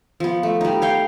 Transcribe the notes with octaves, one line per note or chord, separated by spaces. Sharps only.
F3 B3
A3
G3 D#4
C#5 F5 G5